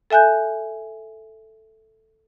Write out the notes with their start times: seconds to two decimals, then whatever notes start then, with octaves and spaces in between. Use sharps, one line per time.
0.10 A4 E5 G#5 F#6 G6